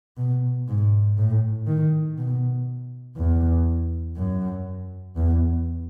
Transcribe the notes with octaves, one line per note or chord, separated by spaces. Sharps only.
B2
G#2
A2
D#3
B2
E2
F#2
E2